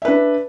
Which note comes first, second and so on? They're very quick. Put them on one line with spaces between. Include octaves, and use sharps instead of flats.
E5 B4 D4